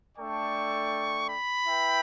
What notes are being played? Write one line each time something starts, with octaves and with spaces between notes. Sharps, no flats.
A3 D4 A4 D5 G5 C#6
B5
E4 B4 E5 G5